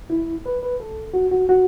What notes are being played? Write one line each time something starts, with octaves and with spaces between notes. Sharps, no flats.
E4
B4
B4
A4
F#4
F#4
F#4